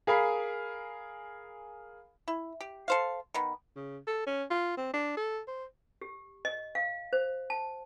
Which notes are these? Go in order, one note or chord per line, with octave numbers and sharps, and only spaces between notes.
G#4 A#4 F5 G#5 B5
E4
G4
A4 C5 F5
D#3 B3
C#3
A4
C#4
F4
C4
D4
A4
C5
G4
D#5
F5
C5
A5